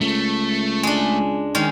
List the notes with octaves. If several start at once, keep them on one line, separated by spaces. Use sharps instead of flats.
C#2 A3
G#3 D4
D#3 G#3 C#4